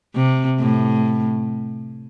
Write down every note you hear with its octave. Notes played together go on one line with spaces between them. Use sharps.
C3
A2